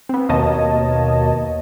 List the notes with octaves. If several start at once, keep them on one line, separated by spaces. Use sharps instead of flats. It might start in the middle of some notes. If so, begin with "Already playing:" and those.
B3 C4
D#2 B2 A#3 C#5 D#5 A5